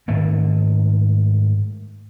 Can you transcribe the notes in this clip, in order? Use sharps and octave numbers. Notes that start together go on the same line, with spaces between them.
G#2 D#3 A3 A#3